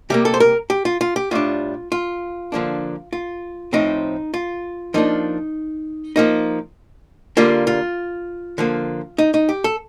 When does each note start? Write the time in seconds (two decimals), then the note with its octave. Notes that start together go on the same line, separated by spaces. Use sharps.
0.10 C3 G3 A#3 G4
0.25 A4
0.34 C5
0.40 A#4
0.70 G4
0.85 F4
1.01 F4
1.16 G4
1.31 A2 G3 D4 F4
1.92 F4
2.52 D3 F3 A#3 D4
3.13 F4
3.73 A2 F3 C4 D#4
4.34 F4
4.94 F3 A#3 D4 D#4
6.16 F3 A#3 D#4
7.37 D3 G3 A#3 F4
7.67 F4
8.58 D3 F3 A#3
9.18 D#4
9.34 D#4
9.49 G4
9.64 A4